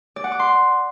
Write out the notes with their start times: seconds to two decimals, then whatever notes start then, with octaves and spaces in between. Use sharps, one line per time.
0.16 D5
0.24 F#5
0.32 D6
0.39 C6